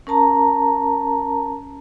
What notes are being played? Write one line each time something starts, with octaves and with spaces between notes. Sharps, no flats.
C#4 A#4 A5 A#5